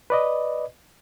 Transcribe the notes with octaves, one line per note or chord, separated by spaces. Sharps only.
B4 D5 D#5